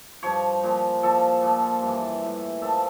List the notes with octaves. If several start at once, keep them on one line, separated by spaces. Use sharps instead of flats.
G2 F3 C#5
A#2 F3
A#2 F3 A4
A#2 F3
G2 E3
A2 E3
A#2 F3 A4